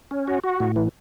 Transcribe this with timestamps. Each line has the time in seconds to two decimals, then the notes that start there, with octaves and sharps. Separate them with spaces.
0.11 C#4
0.28 F#4
0.44 F#4
0.60 A2
0.76 E3